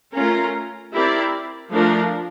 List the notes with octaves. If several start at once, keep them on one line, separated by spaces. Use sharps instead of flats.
A3 C#4 F4 A#4
C4 E4 G4 A#4 D5
F3 A3 D4 F4 A#4